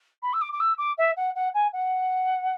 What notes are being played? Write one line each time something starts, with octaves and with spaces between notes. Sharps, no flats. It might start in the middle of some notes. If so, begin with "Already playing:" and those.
B5
E6
D6
D6
E6
D6
E5
F#5
F#5
G#5
F#5